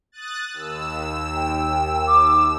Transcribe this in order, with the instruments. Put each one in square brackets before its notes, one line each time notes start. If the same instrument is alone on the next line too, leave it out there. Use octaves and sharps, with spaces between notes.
[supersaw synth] D#6 F#6 A6
D#2 E6
[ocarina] G5
D6